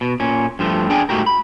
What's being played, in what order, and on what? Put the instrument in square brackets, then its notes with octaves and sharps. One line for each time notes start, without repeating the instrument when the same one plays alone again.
[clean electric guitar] B2
A#2 C#4
G2 F3 A3
D4 G#4 G5 G#5
G#2 A3 F#4 G4 A#4
B5